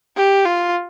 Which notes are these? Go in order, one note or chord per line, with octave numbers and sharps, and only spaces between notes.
G4
F4